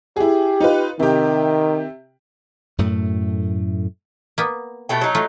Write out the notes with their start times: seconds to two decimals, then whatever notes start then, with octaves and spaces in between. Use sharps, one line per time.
0.17 E4 G4 G#4
0.60 D#4 F4 B4
1.00 C3 D#3 G4
2.78 F#2 A2 A3
4.38 A#3 B3
4.89 B2 A3 G5
5.01 F#3 D#4
5.15 A3 F4